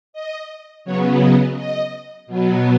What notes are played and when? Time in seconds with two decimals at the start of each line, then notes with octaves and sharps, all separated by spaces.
0.13 D#5
0.85 C#3 F#3 B3 C#5
1.19 D#5
1.56 D#5
2.27 B2 F#3 B3